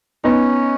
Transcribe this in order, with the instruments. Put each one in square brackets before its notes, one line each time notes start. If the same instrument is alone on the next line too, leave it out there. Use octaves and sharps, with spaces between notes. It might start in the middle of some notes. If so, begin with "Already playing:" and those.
[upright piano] B3 D#4 [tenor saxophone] C#4